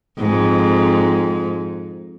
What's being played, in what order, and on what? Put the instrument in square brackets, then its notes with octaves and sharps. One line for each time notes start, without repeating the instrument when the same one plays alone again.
[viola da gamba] F2 G#2